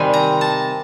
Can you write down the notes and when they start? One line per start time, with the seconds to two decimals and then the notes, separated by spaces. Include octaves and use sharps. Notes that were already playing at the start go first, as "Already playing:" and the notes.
Already playing: C3 D#3 G3 C4 G#5
0.13 A#5
0.41 A5